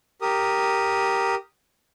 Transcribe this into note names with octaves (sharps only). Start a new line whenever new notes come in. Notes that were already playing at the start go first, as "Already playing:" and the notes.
G4 A#4 D#6